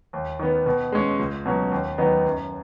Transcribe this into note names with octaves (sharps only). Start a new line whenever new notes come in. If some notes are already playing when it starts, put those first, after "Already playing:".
D#2
D#3 B3
B2
G#3 C#4
C#2
B2 F#3 C#4
D#2
D#3 F#3 B3 D#4
F#2